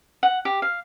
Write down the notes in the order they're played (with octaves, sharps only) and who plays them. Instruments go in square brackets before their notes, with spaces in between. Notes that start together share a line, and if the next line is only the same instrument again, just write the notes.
[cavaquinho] F#5
G4
F5